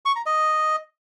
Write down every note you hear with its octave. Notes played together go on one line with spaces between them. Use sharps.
C#6
A#5
D#5